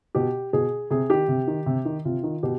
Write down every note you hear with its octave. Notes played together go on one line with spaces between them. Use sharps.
B2 G4
B2 G#4
C3 G#4
D#3 G4
C3
D#3
C3
D#3
C3 F4
D#3
B2 G4